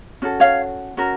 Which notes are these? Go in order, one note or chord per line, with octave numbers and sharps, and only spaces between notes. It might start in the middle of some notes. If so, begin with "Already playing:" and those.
C#4 F#4 A4
C#5 F5
C#4 F#4 A#4